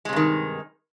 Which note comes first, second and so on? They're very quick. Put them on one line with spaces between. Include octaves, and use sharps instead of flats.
G#3 C3 G2 D#3